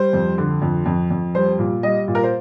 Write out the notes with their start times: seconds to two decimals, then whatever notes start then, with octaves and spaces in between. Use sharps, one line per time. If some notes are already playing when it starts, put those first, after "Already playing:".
Already playing: G3 C5
0.13 F2
0.38 D3
0.62 F2
0.86 F2
1.11 F2
1.35 G3 C5
1.59 A#2
1.83 G3 D#5
2.08 A#2
2.15 A#4
2.23 C5